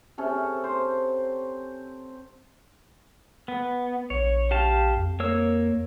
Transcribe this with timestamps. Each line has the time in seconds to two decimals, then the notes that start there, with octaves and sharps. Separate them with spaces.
0.18 C3 C#4 A4
0.64 C5
3.48 B3
4.10 A#1 C#5
4.51 G4 F5 A5
4.96 F2
5.20 A#3 C#5 E6